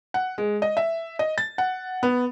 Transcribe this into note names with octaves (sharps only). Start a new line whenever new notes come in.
F#5
G#3
D#5
E5
D#5
A6
F#5
B3